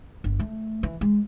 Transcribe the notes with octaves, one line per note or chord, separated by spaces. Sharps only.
G1
A3
E3
G#3